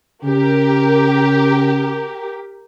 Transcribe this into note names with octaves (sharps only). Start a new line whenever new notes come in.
C#3 G4 A#4